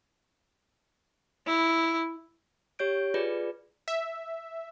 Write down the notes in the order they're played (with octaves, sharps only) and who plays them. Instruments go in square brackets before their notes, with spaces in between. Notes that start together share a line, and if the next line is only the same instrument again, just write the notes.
[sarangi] E4
[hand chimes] G4 C#5 G6 D7
F4 G#4 B4 D5
[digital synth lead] E5